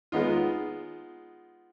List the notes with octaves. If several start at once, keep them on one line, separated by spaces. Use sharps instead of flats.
G#3 B3 D#4 F4